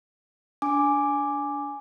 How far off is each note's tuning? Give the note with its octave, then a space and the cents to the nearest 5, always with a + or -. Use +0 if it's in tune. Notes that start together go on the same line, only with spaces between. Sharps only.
D4 -15 G#5 +0 D6 +0